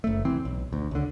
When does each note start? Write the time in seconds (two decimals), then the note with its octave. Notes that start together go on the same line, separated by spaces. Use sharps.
0.04 F#1 A3
0.25 C2 E3 C4
0.45 B1
0.73 D2
0.91 C#2 D3